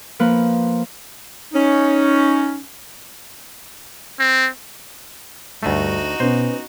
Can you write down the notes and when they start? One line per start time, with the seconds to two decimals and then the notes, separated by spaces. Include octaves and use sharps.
0.19 F3 A#3 B4
1.54 C#4 D#4
4.19 C4
5.63 D2 G2 A3 D#4 F#4
6.20 B2 B3 C#4 C5